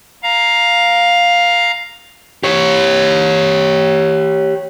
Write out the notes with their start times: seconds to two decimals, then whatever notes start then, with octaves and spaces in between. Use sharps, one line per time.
0.23 F5 A#5
2.43 G4 C#5